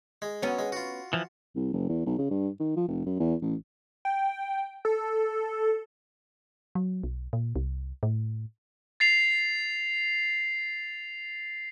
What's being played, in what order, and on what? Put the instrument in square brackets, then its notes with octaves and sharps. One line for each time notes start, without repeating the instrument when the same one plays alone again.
[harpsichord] G#3
[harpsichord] F#3 [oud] B3 C#4
[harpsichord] G#3
F4 F#4
[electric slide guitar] E3 F3
[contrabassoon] C2
F#1
E2
B1
C#3
G2
D#3
F3
F1
F#2
E2
A1
[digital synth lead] G5
A4
[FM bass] F#3
B1
A#2
C2
A2
[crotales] A6 C7 F7